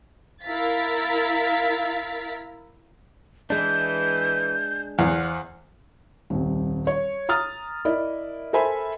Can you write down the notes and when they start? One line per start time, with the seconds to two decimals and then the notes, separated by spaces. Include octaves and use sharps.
0.45 E4 A#4 F5 A6 B6
3.50 E3 G#3 D4 G6
4.99 E2 C5 F5 F#5
6.30 D#1 C2
6.87 C#5
7.29 A#5 D#6 F6 A6
7.85 E4 A#4 D5 D#5
8.53 A4 A#4 C5 E5 G#5 B5